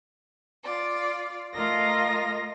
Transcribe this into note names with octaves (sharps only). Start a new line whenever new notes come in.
F4 D5
A3 F4 A#4 D#5 F5 A#6